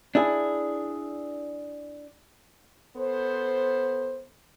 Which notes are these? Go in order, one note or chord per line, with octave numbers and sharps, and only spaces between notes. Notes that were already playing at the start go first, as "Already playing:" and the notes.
D4 E4 G#4
B3 A4 C5